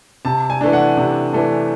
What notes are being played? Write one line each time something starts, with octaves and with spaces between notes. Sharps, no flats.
C3 A5
G#5
E3 A3 D4
F#5
C3
E3 A3 D4